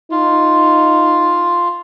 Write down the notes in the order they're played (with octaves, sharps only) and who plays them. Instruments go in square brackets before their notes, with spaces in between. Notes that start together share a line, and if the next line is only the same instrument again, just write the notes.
[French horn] D#4 [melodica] F4